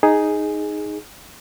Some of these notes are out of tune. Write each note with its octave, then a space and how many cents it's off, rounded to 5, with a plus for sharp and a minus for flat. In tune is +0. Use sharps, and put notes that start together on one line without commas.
D#4 +0 G#4 +0